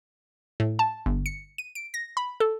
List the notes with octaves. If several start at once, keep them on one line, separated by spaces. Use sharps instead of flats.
A2
A5
G1
C#7
D#7
D7
A#6
B5
A4